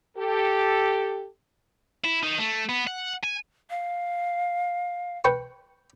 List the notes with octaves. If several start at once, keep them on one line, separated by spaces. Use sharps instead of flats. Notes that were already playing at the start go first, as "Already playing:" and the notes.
G4 A4
E4
D#3
A3
B3
F#5
G#5
F5
B4 G5 C#6